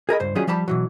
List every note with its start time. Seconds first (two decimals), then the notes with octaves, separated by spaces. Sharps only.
0.09 G#4 A#4 D#5 B5
0.20 C#2 G2 C5
0.35 D#3 F#3 G3 C#4 F4 G#4
0.47 F3 G3 G4 A5 B5
0.68 B2 E3 F#3